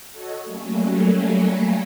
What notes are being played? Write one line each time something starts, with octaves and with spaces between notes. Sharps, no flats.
F#4 A4 C#5 D#5
F#3 G3 A3 A#3 C#4